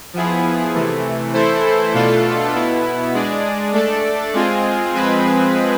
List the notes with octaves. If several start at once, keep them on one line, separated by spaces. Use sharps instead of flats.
F3 B3 E4 G#4
C3 E3 A3
E3 A3 E4 A4 C5
B2 A3 D4 F4 A4
B2 B3 E4
G#3 D4 G#4 D5
A3 D4 A4 D5
G#3 C4 F4 G#4
F3 G#3 C4 G#4 B4